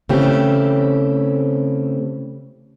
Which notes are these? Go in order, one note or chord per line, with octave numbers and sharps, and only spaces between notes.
C#3 E3 A3 C4 G4